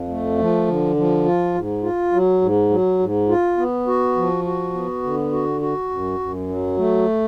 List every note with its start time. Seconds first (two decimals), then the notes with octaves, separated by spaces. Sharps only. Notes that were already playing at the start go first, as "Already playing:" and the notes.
Already playing: F2
0.09 A3
0.38 F3
0.67 D3
0.96 F3
1.25 F4
1.55 G#2
1.83 F4
2.12 F#3
2.42 G#2
2.70 F#3
2.99 G#2
3.29 F4
3.57 B3
3.87 F#4
4.16 F3
4.45 F#4
4.74 B3
5.03 D3
5.32 F#4
5.61 F#4
5.90 F#2
6.19 F#2
6.49 F#3
6.77 A3